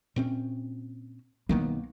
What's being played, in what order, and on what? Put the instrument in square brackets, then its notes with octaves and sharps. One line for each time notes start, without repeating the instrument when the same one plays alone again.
[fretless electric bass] A#2 C4 C#4
[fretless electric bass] B1 D#3 B3 [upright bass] A#3